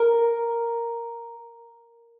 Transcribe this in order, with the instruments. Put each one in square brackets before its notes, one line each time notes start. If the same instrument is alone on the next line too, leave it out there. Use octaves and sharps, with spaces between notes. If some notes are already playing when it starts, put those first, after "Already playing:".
Already playing: [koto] A#4